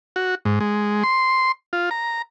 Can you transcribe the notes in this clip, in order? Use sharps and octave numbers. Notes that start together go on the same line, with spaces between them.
F#4
G#2
G#3
C6
F4
A#5